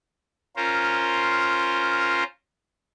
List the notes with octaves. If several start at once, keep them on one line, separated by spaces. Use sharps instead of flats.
C#4 F4 A#4 C5